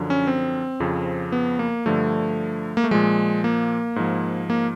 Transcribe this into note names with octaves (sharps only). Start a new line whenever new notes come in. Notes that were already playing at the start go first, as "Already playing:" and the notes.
Already playing: F#2 D3 F3
C#4
C4
F2 C#3 F3
B3
A#3
G2 D3 F3 A3
A#3
A3
A#2 F3 G#3
A#3
G#2 F3
A#3